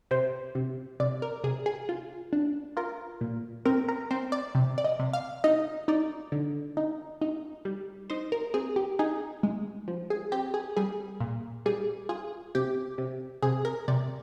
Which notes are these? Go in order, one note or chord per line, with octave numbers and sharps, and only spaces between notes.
C3 C5
C3
C3 D5
A#4
C3 G#4
G#4
F4
D4
F4 A#4
A#2
C4 A#4
A#4
C4 C5
D5
C3
D5
D#5
C3
F5
D#4 D#5
D#4 D5
D3
D#4
D#4
G3
D#4 C5
A#4
C4 G#4
G4
D#4 G#4
G#3
F3
G#4
C4 G4
G#4
G3 G#4
A#2
G3 G#4
F4 G#4
C3 G4
C3
C3 G#4
A#4
C3 D5